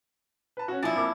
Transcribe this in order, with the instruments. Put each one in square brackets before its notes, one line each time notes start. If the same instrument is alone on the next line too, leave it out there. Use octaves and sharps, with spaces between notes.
[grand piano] B4 A5
C#4 F#4
[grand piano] F3 G#5 A6 [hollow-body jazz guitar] D4 E4
[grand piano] F2 A#3 D6